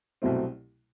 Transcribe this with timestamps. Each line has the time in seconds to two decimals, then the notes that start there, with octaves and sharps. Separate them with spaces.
0.22 C2 B2 F#3 A3 C4